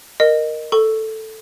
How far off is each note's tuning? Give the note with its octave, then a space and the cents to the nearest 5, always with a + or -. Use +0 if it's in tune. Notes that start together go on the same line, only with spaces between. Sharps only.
A#4 +0 D#5 -15
A4 +0 C#6 +0